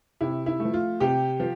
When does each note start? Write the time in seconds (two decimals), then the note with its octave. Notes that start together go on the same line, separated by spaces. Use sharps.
0.21 C3 E4
0.46 E4
0.60 F3 A3
0.74 F4
1.00 C3 G4
1.40 F3